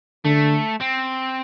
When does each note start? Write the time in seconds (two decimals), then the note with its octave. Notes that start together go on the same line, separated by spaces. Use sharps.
0.25 D3 A3
0.80 C4